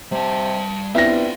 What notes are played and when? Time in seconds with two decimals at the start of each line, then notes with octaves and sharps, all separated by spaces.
0.12 C3 G3 A5
0.95 G2 B3 C4 E4 F4 G4 E5 A#6